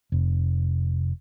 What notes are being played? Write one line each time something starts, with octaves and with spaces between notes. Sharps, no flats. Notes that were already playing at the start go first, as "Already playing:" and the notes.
F1